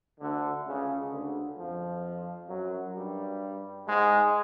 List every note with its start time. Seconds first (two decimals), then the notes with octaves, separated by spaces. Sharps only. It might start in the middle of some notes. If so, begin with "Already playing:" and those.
0.19 D2 D3
0.65 C#2 C#3
1.11 D2 D3
1.57 F2 F3
2.48 F#2 F#3
2.95 G2 G3
3.87 G#2 G#3